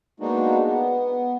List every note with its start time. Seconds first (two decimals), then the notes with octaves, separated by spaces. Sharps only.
0.20 G#3 A#3 B3 D4 D#4 F#4
0.64 B3